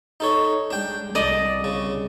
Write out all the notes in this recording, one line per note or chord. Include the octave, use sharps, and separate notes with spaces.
D#4 A4 C#5
G#3 D4 G5
C2 D5 D#5 A5
C#3